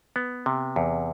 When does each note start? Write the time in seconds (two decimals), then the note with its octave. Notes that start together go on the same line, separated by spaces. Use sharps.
0.16 B3
0.46 C3
0.76 E2